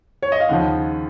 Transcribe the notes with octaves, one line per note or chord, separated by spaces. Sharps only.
C#5
D#5
F5
D#2 C#3 F3 F#5